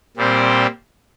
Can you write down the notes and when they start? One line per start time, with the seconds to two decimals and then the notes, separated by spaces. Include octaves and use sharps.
0.17 A#2 G3 C4 G4 C5